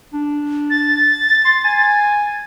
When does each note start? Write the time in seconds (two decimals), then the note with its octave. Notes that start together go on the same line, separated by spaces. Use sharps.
0.13 D4
0.70 A6
1.45 C6
1.65 G#5